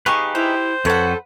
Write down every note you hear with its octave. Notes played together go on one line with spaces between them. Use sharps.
D#4 G4 G#4 B4 F5 C#6
E4 G4 C5
F2 A4 B4 C#5 F#5